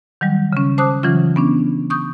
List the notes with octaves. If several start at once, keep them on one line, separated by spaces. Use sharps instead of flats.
D#3 F#3 G3
C#3 C#4
C5 A5 D6 D#6 F#6
C#3 E3 F#3 C#4 F4
B3 C#4 D4
C#6 D#6 G6